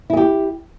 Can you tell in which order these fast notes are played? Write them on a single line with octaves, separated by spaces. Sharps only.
E4 G#4 G4